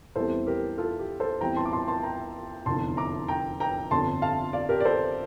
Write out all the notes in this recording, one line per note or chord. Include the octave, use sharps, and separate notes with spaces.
E2 E3 G3 C4 A4 C5
G4 A#4
F4 A4
G4
A4 C5
E2 E3 G3 C4 G5 A#5
A5 C6
D6
A5 C6
A5 C6
G5 A#5
F1 E2 D3 A5 C6
A#5 D6
G5 A#5
G5 A#5
G1 F2 D3 A5 C6
F5 A5
D5 F5
G4 A#4
D5
A4 C5